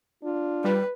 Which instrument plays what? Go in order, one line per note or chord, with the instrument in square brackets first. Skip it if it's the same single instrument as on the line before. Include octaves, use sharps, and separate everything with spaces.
[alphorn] D4 [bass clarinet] F4
[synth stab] G3 [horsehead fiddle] B4